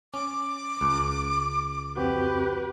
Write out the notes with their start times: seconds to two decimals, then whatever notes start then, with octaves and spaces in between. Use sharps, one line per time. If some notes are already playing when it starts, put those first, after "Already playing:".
0.14 C#4 D6
0.81 C#2
1.97 F2 C4 F#4 G4 B4